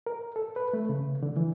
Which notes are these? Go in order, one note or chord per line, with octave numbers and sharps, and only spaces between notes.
A#4
A4
B4
A3
C#3
D3
E3